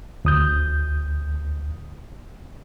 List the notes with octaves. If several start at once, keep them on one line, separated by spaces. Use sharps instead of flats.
D2 D#6 G6